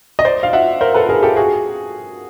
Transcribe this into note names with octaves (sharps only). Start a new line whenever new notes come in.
D#5
C5 D5
F5
E5 F#5
A#4 C5
A4 B4
G#4 A#4
G4 A4
F#4 G#4